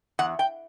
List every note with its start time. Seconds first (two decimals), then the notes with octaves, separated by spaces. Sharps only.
0.19 E2 F#5
0.39 G5